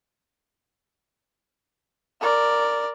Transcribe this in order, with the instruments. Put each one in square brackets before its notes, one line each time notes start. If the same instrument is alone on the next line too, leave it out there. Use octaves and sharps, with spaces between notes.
[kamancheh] A#4 D5